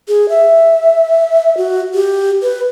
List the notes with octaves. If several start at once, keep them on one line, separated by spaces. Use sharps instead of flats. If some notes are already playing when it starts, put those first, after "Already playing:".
G#4
E5
F#4
G4
B4